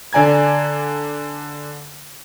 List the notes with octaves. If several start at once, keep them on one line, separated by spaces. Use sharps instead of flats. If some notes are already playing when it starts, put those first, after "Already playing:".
D3 D5 G#5 A#5 G#6